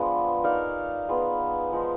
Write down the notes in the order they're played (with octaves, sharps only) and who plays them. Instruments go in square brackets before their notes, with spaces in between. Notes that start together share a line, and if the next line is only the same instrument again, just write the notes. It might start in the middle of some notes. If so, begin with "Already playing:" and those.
Already playing: [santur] F3 G#3 B3 D4
D#4 A#4 D5 F5
B3 F4 G#4
F3 G#3 D#4